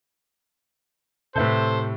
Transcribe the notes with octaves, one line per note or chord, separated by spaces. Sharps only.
A2 C3 A4 B4 C5 E5 G6